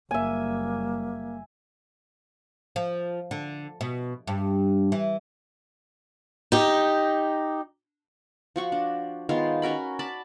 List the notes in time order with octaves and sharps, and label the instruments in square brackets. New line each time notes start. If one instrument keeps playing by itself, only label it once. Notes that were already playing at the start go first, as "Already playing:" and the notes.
[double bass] F#1 G3 [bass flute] A#3 [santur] E5 G#5
[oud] F3
D3
B2
G2
E3
[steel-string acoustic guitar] D#4 G4
[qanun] F3 F#4 C#6
D4
D#3 G#3 B3 F4
C#4 F#4 A#4 B5
D5 A5 B5